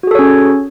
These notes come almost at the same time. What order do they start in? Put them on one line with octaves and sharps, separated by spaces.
F#4 G#4 A4 C#5 C#4